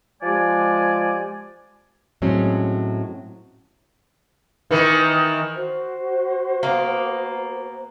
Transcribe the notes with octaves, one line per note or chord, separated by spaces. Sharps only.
F3 G#3 G4 D5 G#5
A2 F#3 G#3 C4 C#4
D#3 E3
F#4 C5
A#3 B3